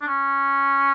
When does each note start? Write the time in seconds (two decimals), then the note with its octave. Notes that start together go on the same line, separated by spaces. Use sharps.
0.02 D4
0.08 C#4